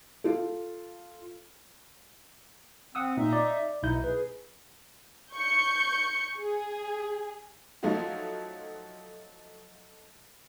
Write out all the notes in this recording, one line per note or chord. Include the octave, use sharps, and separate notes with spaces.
F4 A4
C4 F#5 D#6 E6
A#2 D#4 E5
D5
B1 B2 D#4 E4 G6
G#4 B4
C#6 G6 C#7
G#4
F3 F#3 A3 D#4 F4 F#4